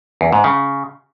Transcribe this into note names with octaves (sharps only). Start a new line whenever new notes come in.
E2
G#2
C#3